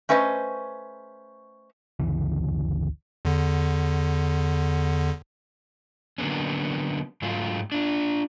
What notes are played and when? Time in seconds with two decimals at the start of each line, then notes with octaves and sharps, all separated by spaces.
0.09 A3 C#4 B4 C5 D#5
2.00 G1 D2 C#3 E3
3.25 E2 D3
6.18 D3 F#3 A#3 B3 C#4
7.22 G#2 F#3 A3 F4
7.72 D4 F4